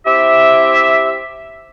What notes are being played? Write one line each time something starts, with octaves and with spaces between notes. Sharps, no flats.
C4 E4 G4 E5